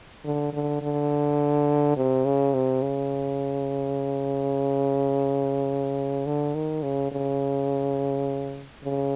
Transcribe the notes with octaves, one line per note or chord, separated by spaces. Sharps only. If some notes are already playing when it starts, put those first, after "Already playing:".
D3
D3
D3
C3
C#3
C3
C#3
D3
D#3
C#3
C#3
C#3